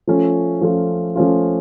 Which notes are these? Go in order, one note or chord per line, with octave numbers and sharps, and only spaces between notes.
F3 A3 C#4 F4
F3 A3 C#4 F4
F3 A3 C#4 F4